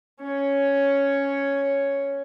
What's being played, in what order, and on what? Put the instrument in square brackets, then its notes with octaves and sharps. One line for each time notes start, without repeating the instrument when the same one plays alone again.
[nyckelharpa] C#4 C#5